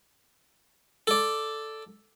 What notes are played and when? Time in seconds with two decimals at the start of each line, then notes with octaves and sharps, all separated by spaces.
1.07 A4 D5